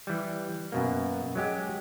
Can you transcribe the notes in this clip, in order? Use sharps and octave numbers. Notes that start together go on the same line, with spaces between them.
E3 G3
F#2 B2 A#3
F#3 G#3 G4